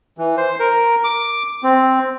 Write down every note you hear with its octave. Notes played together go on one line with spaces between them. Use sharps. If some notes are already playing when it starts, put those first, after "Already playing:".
E3
C5
A#4
D6
C4